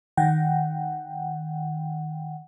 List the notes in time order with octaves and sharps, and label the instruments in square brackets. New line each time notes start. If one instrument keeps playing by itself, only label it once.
[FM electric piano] D#3 F#5 G5